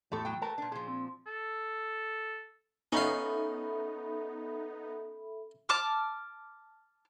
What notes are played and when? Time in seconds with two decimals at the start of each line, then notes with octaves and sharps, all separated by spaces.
0.12 E2 A2 A3 G4 A4
0.25 F#3 G5
0.42 A3 A#4 B4 A5
0.58 A#2 D4
0.72 A#2 F3 G#4
0.88 C4
1.27 A4
2.92 B3 C#4 D#4 A4 E5 F5 B5
5.69 A5 D6 F6